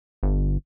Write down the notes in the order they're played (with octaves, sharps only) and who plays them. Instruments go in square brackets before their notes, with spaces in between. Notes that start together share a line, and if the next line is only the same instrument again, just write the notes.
[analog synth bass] G1